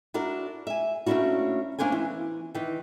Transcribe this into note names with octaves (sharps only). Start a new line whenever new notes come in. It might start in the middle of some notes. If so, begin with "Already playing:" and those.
D4 E4 F#4 A#4
E5 G#5
A3 A#3 C#4 D4 E4 F#4
A#3 C#4 D4 C5 G#5
E3
D#3 E3